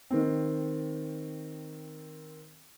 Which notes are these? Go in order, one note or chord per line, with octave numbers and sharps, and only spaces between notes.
D#3 C4